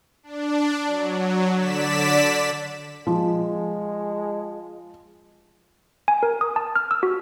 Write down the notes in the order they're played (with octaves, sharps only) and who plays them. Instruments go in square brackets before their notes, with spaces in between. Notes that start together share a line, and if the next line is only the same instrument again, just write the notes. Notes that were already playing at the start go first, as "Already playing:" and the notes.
[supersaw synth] D4
F#3
D3 D5 B6 E7
[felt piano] F3 [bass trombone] G#3
[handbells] G#5
A#4
D#6
A5
F6
E6
F#4